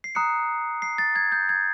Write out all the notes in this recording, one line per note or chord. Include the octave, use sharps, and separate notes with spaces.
C7
A#5 D#6 F#6 C#7
C7
A6
G#6
G6
G#6